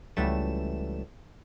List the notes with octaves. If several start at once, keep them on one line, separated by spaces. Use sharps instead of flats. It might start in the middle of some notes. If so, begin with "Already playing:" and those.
C#2 E3 F#3 G3 A3 E7